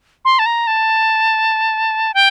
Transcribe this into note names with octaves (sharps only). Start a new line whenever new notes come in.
C6
A5
A#5
A5
G5